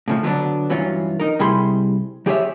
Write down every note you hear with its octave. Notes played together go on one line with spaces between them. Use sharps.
A2 C#3 F3
D3 F#3 B3 C#4 D4
G2 E3 F#3 C#4 F4
D#4 A#4
C3 G3 E4 G#4 B5 C6
F3 G4 G#4 C#5 E5